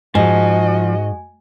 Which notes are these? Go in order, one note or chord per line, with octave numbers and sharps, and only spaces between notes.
G#2 F3 F#4 D#5 G#5